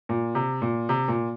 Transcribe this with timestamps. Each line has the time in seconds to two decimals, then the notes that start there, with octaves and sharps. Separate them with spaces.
0.09 A#2
0.35 C3
0.62 A#2
0.89 C3
1.08 A#2